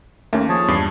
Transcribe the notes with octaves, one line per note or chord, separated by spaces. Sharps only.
D#2 A3 A#3 C#4
F3 G#4 C#5 A5
E2 G2 D6 D#6 C7